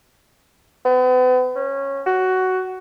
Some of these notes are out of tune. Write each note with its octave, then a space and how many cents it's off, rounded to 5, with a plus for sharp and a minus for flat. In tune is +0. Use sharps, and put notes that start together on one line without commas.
B3 +40
C#4 -15
F#4 +10